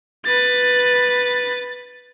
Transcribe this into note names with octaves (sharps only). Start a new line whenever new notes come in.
B4 A6